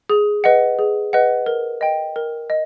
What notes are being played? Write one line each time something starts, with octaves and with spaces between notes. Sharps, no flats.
G#4
B4 D#5 F#5
G#4
B4 D#5 F#5
A#4
D#5 G5
A#4
D#5